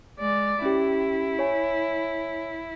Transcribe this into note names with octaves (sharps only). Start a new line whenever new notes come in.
G#3 D5
C#4 E4 G4
C#5 G#5